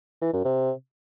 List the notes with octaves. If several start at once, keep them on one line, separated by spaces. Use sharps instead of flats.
E3
F#2
C3